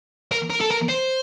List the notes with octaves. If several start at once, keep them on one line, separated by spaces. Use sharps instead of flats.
A#4
A#4
A4
A#4
C5